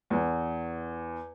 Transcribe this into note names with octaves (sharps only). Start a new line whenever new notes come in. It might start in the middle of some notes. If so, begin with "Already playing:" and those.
E2